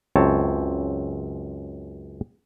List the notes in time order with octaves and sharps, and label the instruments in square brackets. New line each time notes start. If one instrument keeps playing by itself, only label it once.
[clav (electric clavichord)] C#2 F#2 C4 C#5 A5